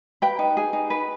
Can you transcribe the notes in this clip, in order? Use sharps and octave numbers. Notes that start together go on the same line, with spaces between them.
B4 G5
D#4
G#4
D#4
B4